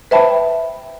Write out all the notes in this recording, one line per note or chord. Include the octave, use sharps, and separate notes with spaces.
B4 C5 E5 G5 A5 B5